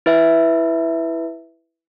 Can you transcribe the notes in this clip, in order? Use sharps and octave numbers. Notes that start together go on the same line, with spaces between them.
E4 B4 E5